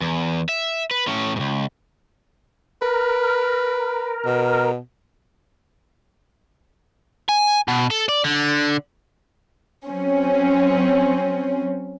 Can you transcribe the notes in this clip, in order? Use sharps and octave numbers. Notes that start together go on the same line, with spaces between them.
E2
E5
B4
A2 C#4
C#2 G#2
A#4 B4
B2
G#5
B2
A4
D5
D3
F#3 C4 C#4